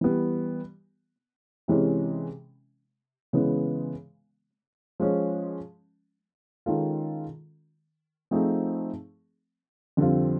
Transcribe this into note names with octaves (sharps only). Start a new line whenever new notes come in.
E3 G3 B3
C3 E3 G#3 C#4
C#3 E3 G#3 B3
F3 G#3 C#4
D#3 G#3 C#4 F4 A4
F3 A3 C4 D#4 G#4
F2 D3 G3 C4 F4